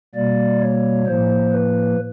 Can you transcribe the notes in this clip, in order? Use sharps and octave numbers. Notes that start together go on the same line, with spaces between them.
B2 G3 A#3 D5
C#5
A2 F3 A#3 C5
B4